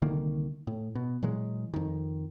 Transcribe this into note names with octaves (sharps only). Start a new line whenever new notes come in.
C2 D3 D#3 A#3
A2
B2
A#2 E3 F#3 G#3
F2 D#3